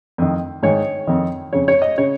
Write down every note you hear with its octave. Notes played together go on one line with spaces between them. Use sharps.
F2 D#3
G#2 D#3 C#5
F2 D#3
F2 C#3 C#5
C#5
D#5
C#3 C#5